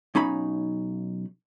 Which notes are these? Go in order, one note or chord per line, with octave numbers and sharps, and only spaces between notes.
B1 C#4 D#4 B5